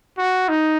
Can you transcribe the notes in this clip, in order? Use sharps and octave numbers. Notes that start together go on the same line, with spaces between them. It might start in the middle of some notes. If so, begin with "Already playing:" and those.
F#4
D#4